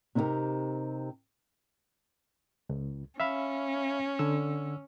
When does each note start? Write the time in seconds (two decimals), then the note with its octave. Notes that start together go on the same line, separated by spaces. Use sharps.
0.15 C3 C4 D#4 E4 G4 A#4
2.69 C#2
3.20 C#4 E5 F5 B5
4.19 D3 E6